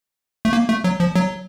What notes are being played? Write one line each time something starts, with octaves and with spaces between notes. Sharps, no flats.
A3
A#3
A3
F#3
F3
F#3